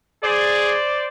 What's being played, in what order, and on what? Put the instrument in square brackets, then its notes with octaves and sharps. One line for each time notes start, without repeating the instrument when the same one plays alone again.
[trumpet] G#4 [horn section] C5 D5